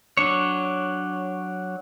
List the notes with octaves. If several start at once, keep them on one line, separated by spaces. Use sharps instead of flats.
F#3 D4 C#5